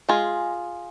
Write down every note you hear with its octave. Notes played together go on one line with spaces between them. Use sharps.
G#3 F4 G#4